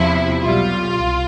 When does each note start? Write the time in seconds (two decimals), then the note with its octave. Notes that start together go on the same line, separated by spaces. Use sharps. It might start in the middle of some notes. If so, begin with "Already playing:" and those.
Already playing: E2 C3 F3 E4
0.42 B1 B2 G3 F4
0.96 C2